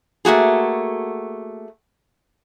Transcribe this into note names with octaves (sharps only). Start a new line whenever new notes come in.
A3 A#3 F#4 G#4